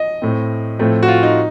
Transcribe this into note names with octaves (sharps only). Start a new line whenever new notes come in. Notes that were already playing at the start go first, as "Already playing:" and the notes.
Already playing: D#5
A2 A3 C4
A2 F3 A3 C4
F#4
F4
D#4